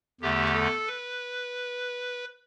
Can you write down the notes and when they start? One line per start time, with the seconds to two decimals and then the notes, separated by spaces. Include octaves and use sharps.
0.21 E2 D3 A3 G4
0.54 A4
0.87 B4